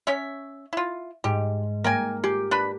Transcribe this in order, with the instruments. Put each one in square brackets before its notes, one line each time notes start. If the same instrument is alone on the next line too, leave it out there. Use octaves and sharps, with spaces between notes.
[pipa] C#4 C#5 E5
E4 F4
[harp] G#2 [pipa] G4
[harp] A#3 [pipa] A#4 G5 G#5
[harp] G4 [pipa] G#4
[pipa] D4 B4 B5